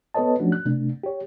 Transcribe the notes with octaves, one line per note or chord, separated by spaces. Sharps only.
B3 A4 B4 C#5 D#5 A5
F3 F#3 A3 C#4 D4 F#4
F#6
C3 A3 D4
G4 C#5